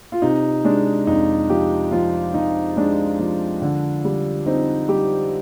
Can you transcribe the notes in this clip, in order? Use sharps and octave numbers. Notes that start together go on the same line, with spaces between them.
F4
C3 D#4
G#3 D4
F2 D#4
F3 G4
F3 F4
F3 D#4
G#3 D4
F3
D3
G3
C4 D#4
G3 G4